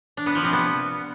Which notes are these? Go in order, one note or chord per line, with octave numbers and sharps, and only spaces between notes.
D4
B3
F3
C3
B3